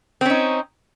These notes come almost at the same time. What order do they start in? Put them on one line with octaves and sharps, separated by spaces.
C4 C#4 D#4